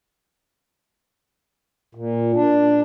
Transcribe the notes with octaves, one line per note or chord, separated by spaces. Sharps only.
A#2
D4